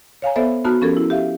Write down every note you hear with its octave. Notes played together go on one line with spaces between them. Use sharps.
C#5 F5 G#5 A#5
B3 A4 C5 D5 E5
B3 D#4 F#4 A5 A#5 F6
F3 C#4 G4 A4 A#4 G#6
E4
G4 E5 F5